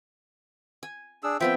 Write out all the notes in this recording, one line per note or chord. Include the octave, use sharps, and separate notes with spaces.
G#5
D4 G#4 E6
F3 B3 C4 E5 G5